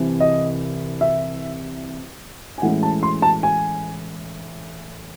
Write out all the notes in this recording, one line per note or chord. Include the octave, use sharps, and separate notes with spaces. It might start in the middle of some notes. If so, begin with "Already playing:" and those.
Already playing: C2 C3 E3 C4
D#5
E5
G#5
A2 E3 G#3 C#4 F#5
A5
C6
A5
G#5